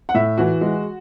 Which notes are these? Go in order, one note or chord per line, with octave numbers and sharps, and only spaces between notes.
F#5
A2 E5
E3 F#4
G#3